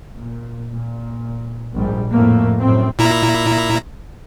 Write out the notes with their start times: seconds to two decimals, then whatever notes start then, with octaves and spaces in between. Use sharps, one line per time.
0.16 A#2
0.72 A#2
1.74 A#1 G#2 G3
2.11 F2 A2 A3 A#3
2.59 F#2 A2 C4
2.99 A#2 E4 A#5